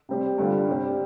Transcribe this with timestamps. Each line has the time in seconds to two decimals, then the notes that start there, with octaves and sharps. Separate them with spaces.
0.09 C3 G3 C4 G4
0.38 G2 D3 G3 D4 F4
0.68 C3 G3 C4 G4